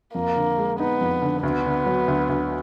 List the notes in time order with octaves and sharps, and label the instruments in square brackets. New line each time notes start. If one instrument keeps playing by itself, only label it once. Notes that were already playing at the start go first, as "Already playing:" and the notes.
[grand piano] F2 [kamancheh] A#3
[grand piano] D3
G#3
[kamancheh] B3 [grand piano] D#4
[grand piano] F2
D3
[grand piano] D2 [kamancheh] B3
[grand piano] D3
F#3
D2
D2